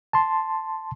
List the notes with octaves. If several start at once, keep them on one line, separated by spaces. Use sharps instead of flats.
A5 C6